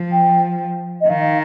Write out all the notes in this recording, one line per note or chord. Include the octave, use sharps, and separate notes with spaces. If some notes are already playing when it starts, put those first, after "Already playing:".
Already playing: F3
G5
D#5
D#3 F5